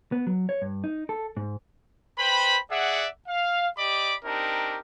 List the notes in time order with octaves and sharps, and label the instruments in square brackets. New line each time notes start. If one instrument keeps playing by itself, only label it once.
[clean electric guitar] B3
F#3
C#5
G2
D#4
A4
G#2
[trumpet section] B4 C5 G5 B5
G#4 D5 E5 F#5
F5
G4 D5 D#5 B5 D6
C4 D4 D#4 G4 A#4